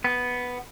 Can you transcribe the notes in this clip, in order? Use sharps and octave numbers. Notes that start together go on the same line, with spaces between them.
B3